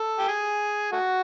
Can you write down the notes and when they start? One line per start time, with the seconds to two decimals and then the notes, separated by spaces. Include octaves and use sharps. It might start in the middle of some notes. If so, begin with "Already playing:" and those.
Already playing: A4
0.19 G4
0.28 G#4
0.92 A3 F#4